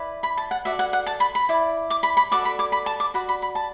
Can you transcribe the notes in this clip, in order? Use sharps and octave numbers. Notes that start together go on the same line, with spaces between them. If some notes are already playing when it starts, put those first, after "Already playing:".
Already playing: E4 B4 D5
B5
A5
F#5
F#4 A4 D5 E5
F#5
F#5
A5
B5
B5
E4 D5
D6
B5
B5
F#4 A4 D5 D6
B5
D6
B5
A5
D6
F#4 D5 B5
B5
B5
A5